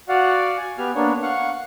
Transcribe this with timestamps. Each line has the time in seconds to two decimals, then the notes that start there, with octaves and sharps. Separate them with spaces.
0.09 F#4 D5 F5 F#5
0.57 G#5
0.78 B3 G4 G#5 F6
0.95 A#3 B3 D4 C#5
1.22 F5 F#5 C#6